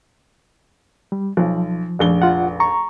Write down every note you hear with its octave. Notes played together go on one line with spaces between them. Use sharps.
G3
B1 F3
F1 A#1 G7
F4 F#5
A#5 C#6